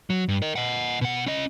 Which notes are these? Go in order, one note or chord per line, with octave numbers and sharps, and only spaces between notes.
F#3
G2
A#4 D#5
D#5 F#5
B2 F#5
C#4 D#5